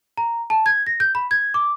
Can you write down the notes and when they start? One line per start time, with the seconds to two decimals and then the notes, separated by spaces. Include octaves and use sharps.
0.18 A#5
0.50 A5
0.66 G#6
0.87 A#6
1.00 G6
1.15 B5
1.31 G#6
1.54 D6